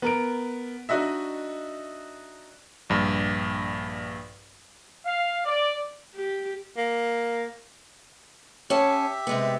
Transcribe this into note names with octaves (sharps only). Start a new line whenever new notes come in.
B3 A#4 D7
D4 D#4 F#4 D#5 E5
A#1 G2
F5
D5
G4
A#3
C#4 G4 C#5 E5 A5
C3 G#3 B3